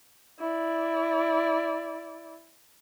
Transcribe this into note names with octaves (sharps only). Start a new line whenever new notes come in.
E4 D5